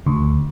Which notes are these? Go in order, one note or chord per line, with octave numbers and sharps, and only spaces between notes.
D2